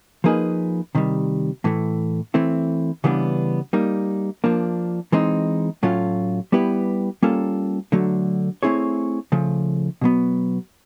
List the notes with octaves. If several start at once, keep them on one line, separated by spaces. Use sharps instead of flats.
F3 A#3 D#4 G#4 B4
C3 D#3 G3
A2 E3 A3
E3 A3 C4 E4
C#3 E3 G3 B3 D4
G3 A#3 D#4
F3 A#3 D4
E3 G#3 C4 D#4
A2 F#3 A3 C#4 F4
G3 B3 E4 G4 B4
G3 A#3 C#4 F4 A4
D3 F#3 A3
A3 C4 E4 G#4 C#5
C#3 F3 A3
B2 F#3 B3